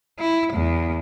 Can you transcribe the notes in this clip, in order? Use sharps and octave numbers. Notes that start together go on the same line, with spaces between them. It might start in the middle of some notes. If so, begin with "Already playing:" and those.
E4
E2